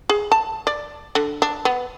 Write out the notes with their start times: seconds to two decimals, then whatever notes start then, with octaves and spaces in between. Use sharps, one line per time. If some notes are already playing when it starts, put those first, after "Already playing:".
0.09 G#4
0.32 A5
0.67 D5
1.15 D3
1.42 D4
1.65 B3